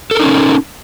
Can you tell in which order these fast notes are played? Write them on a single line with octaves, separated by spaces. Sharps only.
A4 A#4 D#4 C#4